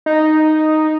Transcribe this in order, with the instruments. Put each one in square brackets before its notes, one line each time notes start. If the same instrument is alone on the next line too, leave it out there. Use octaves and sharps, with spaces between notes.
[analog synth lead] D#4